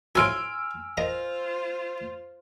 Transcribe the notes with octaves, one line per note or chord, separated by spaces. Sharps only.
A2 F3 F#4 G#5 C6 E6 F6 D7
F4 A#4 C5 D#5 F5